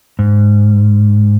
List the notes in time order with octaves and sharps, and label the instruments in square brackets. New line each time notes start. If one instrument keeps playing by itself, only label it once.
[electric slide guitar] G#2